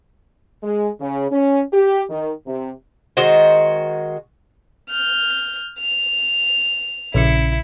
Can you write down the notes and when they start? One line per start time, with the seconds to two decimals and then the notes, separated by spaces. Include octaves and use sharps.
0.63 G#3
1.01 C#3
1.31 C#4
1.73 G4
2.10 D#3
2.47 C3
3.17 D#3 G#3 F#4 C5
4.90 F6 G6
5.79 F7
7.14 A#1 C#3 E4 C#7